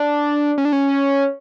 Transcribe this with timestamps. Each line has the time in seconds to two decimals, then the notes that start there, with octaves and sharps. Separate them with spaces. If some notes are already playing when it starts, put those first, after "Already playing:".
Already playing: D4
0.58 C#4
0.65 D4
0.73 C#4